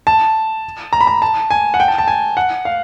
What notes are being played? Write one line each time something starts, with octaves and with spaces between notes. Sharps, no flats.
A5
A#5
B5
A#5
A5
G#5
F#5
G5
A5
A5
G#5
F#5
F5